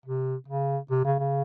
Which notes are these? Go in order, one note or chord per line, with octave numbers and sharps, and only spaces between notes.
C3
C#3
C3
C#3
C#3